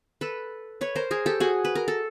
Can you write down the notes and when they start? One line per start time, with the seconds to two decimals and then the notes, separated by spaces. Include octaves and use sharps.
0.21 A4 B4
0.81 B4 C#5
0.96 A#4 C5
1.11 G#4 A#4
1.26 G4 A4
1.40 F#4 G#4
1.65 B4
1.75 A#4
1.88 A4